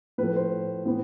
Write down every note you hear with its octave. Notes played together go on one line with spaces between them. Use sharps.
A2 F3 A3 B4
C5
A2 E3 B3